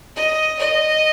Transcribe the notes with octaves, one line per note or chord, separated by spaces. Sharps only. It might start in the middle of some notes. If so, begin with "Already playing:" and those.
D#5
D#5